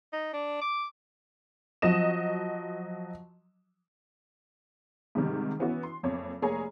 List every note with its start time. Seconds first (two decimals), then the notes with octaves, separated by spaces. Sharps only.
0.13 D#4
0.33 D4
0.61 D6
1.82 F3 F#3 D#5 E7
5.15 G#2 C3 D#3 G3
5.59 E3 B3 C#4 E4 F#4
5.83 C6
6.03 F#1 F2 C#5 D6
6.42 F1 A#3 G#4 C#5 G#5 A#5